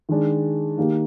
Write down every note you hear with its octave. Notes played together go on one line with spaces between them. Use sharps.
D#3 G#3 D4
D#3 A#3 D#4 G4